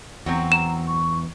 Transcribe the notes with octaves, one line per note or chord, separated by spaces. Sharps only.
E2 F#3 C4 F#4
A#5 E7
C#6